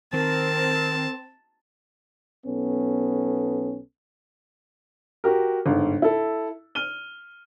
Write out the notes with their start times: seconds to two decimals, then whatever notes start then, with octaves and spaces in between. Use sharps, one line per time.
0.13 D#3 C4 A#4 A5
2.46 B1 B3 C#4 A4
5.24 F#4 G4 A#4
5.66 G1 G#2
6.02 E4 A4
6.75 F6 D#7 G7